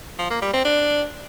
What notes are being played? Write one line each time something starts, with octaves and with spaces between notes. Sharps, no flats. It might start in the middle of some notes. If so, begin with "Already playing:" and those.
F3
A#3
G3
C4
D4